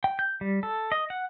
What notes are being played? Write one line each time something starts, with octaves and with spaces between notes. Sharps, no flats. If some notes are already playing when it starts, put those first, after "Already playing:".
G5
G6
G3
A4
D#5
F#5